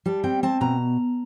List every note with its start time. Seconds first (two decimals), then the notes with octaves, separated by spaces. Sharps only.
0.06 G3 A5
0.24 C4 G5
0.43 C4 A5
0.61 B2 A#5